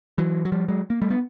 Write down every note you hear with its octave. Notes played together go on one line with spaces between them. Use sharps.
E3 F#3
F#3
F3 G3
F#3 G#3
A#3
G3 A3
B3